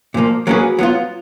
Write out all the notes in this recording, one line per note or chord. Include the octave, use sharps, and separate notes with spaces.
A#2 F3 A#3
F#3 A#3 C#4 G#4 B4
F#3 B3 F4